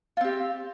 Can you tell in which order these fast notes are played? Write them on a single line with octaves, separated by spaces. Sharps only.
F4 C4 G4